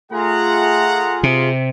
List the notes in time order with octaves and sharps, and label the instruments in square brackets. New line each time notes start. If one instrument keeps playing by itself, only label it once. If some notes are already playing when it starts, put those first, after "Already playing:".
[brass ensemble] A3 F#5 A#5 [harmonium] F4 G#4
[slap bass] C3